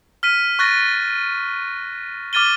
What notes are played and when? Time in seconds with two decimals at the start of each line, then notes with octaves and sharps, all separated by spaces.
0.23 F6 B6 D#7
0.59 C#6 F#6 A6 A#6
2.33 D6 F6 A6 D#7 G7